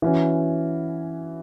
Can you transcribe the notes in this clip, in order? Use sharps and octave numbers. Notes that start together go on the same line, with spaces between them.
E3 C#4 F#4